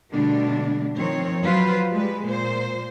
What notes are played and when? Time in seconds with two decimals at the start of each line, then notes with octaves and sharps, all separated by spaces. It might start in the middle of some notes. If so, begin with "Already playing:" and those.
0.12 B2 D3 G3 A3 D4
0.97 D#3 F3 C4 C#5
1.42 F3 F#3 F4 B4 C5
1.91 G3 G#3 B4
2.27 A#2 C5